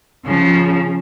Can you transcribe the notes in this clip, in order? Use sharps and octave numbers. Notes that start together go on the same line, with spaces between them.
C#3 F3